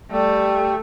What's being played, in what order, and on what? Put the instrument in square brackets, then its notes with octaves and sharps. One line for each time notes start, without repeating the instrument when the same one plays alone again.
[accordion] G3 [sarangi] A3